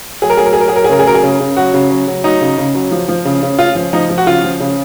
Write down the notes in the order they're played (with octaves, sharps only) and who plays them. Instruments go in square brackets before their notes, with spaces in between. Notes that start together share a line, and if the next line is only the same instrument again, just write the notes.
[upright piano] F#3 G#4
A#4
F#3 G#4
A#4
G#4
F#3 A#4
G#4
F#3 A#4
G#4
C#3 A#4
G#4
F#3 A#4
G#4
C#3
C#3
F#3 F#4
C#3
F#3
F#3
F#3 D#4
C#3
C#3
F#3
F3
F3
C#3
C#3
C#3 F4
F3
F3 D#4
F3
F#4
C#3 F4
F3
C#3